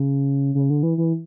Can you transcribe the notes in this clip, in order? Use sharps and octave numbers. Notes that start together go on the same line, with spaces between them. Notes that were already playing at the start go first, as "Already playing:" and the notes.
Already playing: C#3
C#3
D3
E3
E3